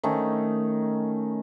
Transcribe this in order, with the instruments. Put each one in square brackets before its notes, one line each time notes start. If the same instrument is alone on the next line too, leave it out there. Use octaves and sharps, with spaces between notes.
[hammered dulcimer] D#3 A3 C#4 D#4